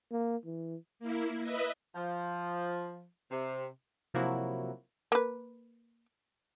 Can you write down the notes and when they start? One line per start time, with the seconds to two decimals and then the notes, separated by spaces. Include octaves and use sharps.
0.12 A#3
0.45 E3
0.99 A#3 E4
1.43 B4 D#5 E5
1.95 F3
3.30 C3
4.14 C3 F3 F#3 A#3 E4 F#4
5.12 A#3 B4